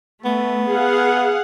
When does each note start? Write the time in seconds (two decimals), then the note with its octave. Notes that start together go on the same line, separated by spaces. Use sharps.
0.25 A3 B3
0.70 G#4 F5 F#5